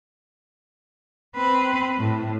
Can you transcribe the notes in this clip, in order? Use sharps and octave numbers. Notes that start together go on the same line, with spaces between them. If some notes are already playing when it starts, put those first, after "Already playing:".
C4 B4
A2